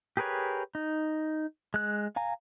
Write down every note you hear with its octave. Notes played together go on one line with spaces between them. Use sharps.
G4 G#4 A#4 B4 C#5
D#4
G#3 F#6
F5 G#5 A#5